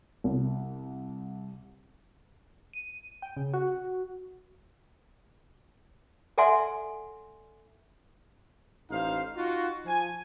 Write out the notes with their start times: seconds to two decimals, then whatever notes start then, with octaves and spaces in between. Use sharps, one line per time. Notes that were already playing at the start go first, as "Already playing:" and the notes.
0.24 C2
2.73 D#7
3.22 G5
3.37 C#3
3.53 F#4
6.38 A4 D5 E5 F#5 G#5 C6
8.91 A1 D#4 C5 F5
9.35 D#4 F4 F#4
9.86 F3 G#5